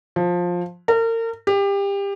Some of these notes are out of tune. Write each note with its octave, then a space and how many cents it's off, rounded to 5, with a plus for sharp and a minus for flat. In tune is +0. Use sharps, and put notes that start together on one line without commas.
F3 +15
A#4 -35
G4 +25